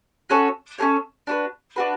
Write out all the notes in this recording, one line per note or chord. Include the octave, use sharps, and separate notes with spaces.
C#4 F#4 A4 C#5
C#4 F#4 A4 C#5
D4 F#4 B4
D4 F#4 B4